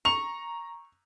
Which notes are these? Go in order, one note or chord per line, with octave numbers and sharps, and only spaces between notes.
A#5 C#6 F7